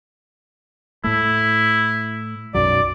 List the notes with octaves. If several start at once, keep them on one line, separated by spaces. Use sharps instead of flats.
A2 A3 E4
B1 F#2 F#3 D5